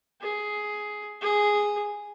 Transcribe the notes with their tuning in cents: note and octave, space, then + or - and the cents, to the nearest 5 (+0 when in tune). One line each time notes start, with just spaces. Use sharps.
G#4 +10
G#4 -5